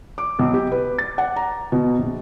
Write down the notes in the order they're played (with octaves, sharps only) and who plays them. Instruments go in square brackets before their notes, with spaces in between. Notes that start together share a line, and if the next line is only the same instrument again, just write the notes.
[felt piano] D6
B1
G4
B4
A6
F#5
A#5
B2
A#1